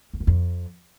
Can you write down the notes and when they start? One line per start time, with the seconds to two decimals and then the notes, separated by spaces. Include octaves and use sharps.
0.14 F2
0.20 F#2
0.27 F2